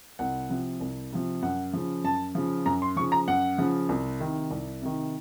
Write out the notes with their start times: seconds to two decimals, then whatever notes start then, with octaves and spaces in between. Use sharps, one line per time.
0.19 C2 F#5
0.50 C3 F3
0.80 C2
1.12 C3 F3
1.42 F#2 F#5
1.73 C#3 F3
2.04 F#2 A5
2.35 C#3 F3
2.66 F#2 A#5
2.82 C6
2.96 F3 C#6
3.00 C#3
3.12 A#5
3.28 F#2 F#5
3.58 C#3 F3
3.89 C2
4.20 C3 D#3
4.51 C2
4.82 C3 D#3